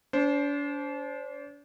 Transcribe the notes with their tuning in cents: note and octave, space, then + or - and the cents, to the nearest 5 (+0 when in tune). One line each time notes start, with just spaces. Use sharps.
D4 -40 C5 +0